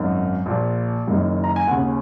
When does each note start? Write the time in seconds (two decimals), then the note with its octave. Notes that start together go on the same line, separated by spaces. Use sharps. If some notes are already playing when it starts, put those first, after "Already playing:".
Already playing: G#1 F#2 D#3
0.46 A#1 A#2
1.07 F#1 F#2 D#3
1.44 A#5
1.56 G#5
1.68 D#2 C#3 F#5